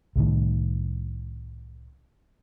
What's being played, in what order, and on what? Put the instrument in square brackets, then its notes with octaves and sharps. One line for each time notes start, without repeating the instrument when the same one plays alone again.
[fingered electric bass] C2 A2 D#3